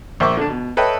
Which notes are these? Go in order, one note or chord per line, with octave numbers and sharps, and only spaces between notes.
A#1 C5 E5 C#6 D6
D3 D4
B2
A4 B4 C#5 D#5 E5 G5